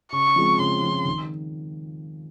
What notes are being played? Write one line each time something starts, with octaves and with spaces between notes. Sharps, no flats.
C#3 C#6
F3 G#3 C4
C#3 C6
F3 G#3 C4
D#3